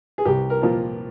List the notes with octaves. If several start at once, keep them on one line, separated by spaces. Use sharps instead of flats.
G#4
C2 G4
A#4
A#2 F3